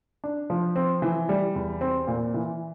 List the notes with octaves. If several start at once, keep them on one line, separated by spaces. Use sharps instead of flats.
D4
F3
C4
E3
G3
E2
C4
A#2
E3